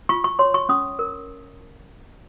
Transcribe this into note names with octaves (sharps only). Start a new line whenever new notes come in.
F4 C#6
C#6
C#5 C6
C#6
C#4 D#6
A#4